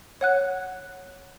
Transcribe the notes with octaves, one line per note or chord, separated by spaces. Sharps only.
C#5 F#5 F#6